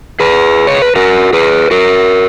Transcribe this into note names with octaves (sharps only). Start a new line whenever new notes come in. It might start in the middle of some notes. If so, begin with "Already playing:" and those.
G#4 B4
C#5
B4
F#4 A#4
G#4 B4
F#4 A#4